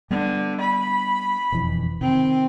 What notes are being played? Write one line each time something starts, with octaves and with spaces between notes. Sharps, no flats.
D3 G3 B3
B5
E1 F2 E3
C3 D#3 C4